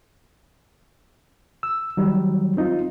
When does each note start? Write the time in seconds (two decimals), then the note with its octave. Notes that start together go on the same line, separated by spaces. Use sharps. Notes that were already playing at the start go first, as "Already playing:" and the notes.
1.63 E6
1.97 D#3 F#3 G3
2.57 C4 D#4 F4